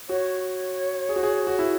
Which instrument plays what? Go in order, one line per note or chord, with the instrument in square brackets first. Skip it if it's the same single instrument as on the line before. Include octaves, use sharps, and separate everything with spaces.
[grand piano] F#4 [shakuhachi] C#5
[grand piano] G#4
F#4
G#4
F#4
E4